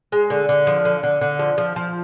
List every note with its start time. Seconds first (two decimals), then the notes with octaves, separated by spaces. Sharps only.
0.12 G#3
0.30 D3
0.49 D3
0.67 F3
0.85 D3
1.03 D3
1.21 D3
1.39 F3
1.58 F3
1.76 F3